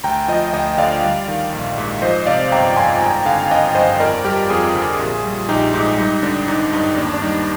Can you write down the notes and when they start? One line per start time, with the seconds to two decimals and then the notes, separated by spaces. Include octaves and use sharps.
0.04 D2 G5 A#5
0.28 F3 D#5 G5
0.53 D2 D#5 G5
0.78 D3 D5 F5
1.03 G3
1.28 D#3
1.52 A#1
1.78 G#2
2.02 F3 C5 D#5
2.26 C3 D5 F5
2.52 G1 G5 A#5
2.76 F2 G#5 C6
3.01 G#1 G5 A#5
3.25 D3 F5 G#5
3.50 G#1 D#5 G5
3.75 G2 C5 D#5
4.00 F2 A#4 D5
4.24 G3 G4 A#4
4.50 F2 F4 G#4
4.74 D3
4.99 A#1
5.24 G3
5.49 A#1 D#4 G4
5.74 G#2 D#4
5.98 G3 D#4
6.23 D3 D4
6.48 G#1 D#4
6.72 G2 D#4
6.97 D#2 D4
7.14 D4
7.22 G3 D#4